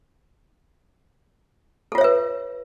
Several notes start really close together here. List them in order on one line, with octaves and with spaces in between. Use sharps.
A4 F4 C#5 E5 B4